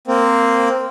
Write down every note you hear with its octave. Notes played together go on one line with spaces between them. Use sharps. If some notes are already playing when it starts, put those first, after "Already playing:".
A#3 C4